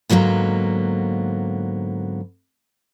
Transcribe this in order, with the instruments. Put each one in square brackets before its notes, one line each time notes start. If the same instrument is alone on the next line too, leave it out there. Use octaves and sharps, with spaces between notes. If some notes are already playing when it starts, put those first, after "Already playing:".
[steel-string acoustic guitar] G#2 D3 F#3 A#3 B3